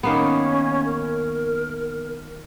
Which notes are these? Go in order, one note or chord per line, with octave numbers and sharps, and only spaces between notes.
D#3 A#3 B3 C#4
A#4